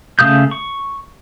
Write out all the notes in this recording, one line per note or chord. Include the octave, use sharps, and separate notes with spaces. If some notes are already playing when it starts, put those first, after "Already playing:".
C#3 A3 F5 D#6 G6
C#6